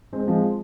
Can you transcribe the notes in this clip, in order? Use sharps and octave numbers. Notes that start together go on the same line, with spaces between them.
G#3 C4
F3 G#3